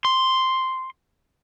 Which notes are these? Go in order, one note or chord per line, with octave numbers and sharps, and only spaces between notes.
C6